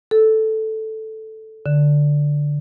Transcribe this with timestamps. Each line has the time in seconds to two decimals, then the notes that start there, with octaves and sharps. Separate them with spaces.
0.11 A4
1.66 D3